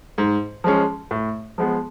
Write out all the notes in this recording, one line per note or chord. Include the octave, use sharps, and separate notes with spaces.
G#2
F3 G#3 C#4
A2
F3 G#3 B3